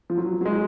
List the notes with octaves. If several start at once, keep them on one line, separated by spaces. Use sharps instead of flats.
F3
F#3
F#3
G#3